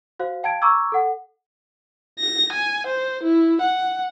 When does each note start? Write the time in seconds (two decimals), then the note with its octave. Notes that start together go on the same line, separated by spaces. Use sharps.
0.19 F#4 C5 F5
0.43 F5 G5 A5 G#6 D7
0.61 A#5 C#6 D6 E6 G#6
0.92 A4 F#5
2.19 A#6
2.52 G#5
2.87 C5
3.23 E4
3.61 F#5